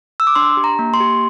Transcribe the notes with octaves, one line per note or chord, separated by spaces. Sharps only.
E6
D6
D4 C6
G4
A#5
A#3
C6
G4